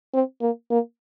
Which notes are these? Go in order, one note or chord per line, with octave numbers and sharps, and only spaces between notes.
C4
A#3
A#3